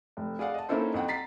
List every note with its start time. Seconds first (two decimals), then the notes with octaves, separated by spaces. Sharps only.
0.17 F1
0.39 G#4 D5 F5 F#5
0.54 D#5 A5
0.69 A#3 C#4 D#4 E4 A4 C5
0.94 F2 F#5 G5
1.08 A#5 A6 B6 C7